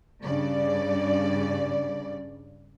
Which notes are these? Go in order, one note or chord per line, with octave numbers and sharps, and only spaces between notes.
G2 C#3 D5